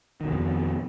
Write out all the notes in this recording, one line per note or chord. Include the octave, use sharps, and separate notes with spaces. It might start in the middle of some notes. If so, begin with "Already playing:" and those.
F2 B2 D#3